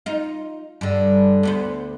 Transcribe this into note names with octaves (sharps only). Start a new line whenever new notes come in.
D#4 F4
G2 D3
D2 B3 C5